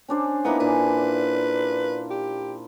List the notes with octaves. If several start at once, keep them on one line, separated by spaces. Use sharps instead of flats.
C#4 D4 C5
A#3 B3 D#4 E4
A#2 D4 B4 G#5
G4